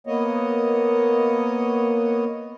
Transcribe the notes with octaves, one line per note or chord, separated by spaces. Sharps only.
A#3 B3 C#5 D#5